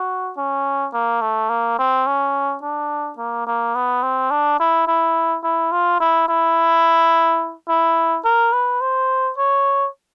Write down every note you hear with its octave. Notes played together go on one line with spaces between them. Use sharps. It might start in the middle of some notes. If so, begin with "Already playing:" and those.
Already playing: F#4
C#4
A#3
A3
A#3
C4
C#4
D4
A#3
A#3
B3
C4
D4
E4
E4
E4
F4
E4
E4
E4
A#4
B4
C5
C#5